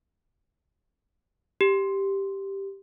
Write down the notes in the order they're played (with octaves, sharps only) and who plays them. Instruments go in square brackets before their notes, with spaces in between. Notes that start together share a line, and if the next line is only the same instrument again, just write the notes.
[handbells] G4